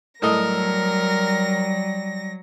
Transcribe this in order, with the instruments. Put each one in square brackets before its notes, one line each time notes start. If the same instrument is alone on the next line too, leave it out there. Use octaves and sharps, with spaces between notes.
[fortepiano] A2 A4 D#5 [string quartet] F#3 A#6 [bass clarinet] G3 [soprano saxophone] A#4